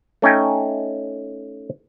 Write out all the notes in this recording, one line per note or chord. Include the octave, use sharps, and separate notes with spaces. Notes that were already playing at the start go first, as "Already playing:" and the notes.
A3 C#4 D#4 G5 G#5